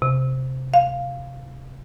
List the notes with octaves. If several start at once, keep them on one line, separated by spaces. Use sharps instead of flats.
C3
F5